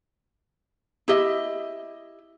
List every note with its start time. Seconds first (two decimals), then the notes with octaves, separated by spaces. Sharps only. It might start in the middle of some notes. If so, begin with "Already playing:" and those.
1.08 E4 G4 D#5 E5